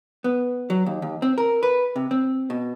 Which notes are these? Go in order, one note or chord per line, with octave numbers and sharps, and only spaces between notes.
B3
F#3
D#2
D#2
C4
A#4
B4
C3
C4
B2